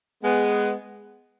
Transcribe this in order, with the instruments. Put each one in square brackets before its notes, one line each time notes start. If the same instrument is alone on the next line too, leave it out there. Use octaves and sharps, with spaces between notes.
[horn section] G#3 B3